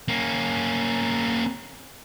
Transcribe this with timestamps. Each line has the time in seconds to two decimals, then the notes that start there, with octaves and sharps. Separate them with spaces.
0.08 A#3 C#4